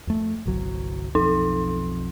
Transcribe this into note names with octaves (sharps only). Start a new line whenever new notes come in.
F2 A3
G1 C2 F#3
B1 F2 D#4